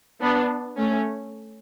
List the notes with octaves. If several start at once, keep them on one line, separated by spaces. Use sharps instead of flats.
B3 D4
A3 C#4